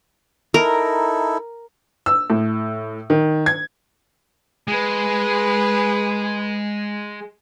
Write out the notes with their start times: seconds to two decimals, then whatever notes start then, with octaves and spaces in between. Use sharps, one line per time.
0.54 D#4 E4 A4 A#4
2.06 E6
2.30 A2
3.10 D#3
3.46 G#6
4.68 G#3 G#4 B4